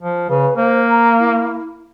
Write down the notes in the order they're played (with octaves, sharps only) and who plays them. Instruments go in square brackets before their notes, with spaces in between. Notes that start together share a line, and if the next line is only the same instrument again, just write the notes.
[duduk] F3
[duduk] C#3 [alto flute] B4
[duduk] A#3 [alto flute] C5
[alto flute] A#5
E4